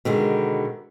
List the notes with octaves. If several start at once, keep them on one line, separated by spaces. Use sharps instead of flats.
B2 D3 D#3 G#3